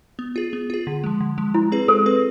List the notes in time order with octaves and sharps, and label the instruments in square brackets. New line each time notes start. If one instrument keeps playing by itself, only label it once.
[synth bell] B3
F4 G#4
B3
F4 G#4
D3
F3 G#3
D3
F3 G#3
[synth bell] G#3 [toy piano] E4
[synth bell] C4 G#4 B4
[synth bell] G#3 [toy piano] A4
[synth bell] C4 G#4 B4